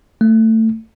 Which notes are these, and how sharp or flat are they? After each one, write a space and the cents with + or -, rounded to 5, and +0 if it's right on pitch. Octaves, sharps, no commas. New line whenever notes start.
A3 +20